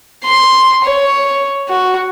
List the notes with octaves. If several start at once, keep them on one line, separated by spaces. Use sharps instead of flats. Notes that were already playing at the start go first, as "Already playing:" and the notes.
C6
C#5
F#4